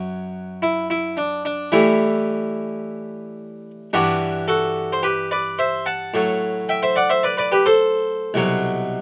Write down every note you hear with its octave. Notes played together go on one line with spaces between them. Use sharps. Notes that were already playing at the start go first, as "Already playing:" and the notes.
Already playing: F#2 F#3
E4
E4
D4
D4
A2 E3 G3 E4
G2 E3 G3 D4 F#4
F#4 A4
C5
G4 B4
B4 D5
C5 E5
F#5 A5
A2 F#3
E5 G5
C5 E5
D5 F#5
C5 E5
B4 D5
B4 D5
G4 B4
A4 C5
C2 B2 F#3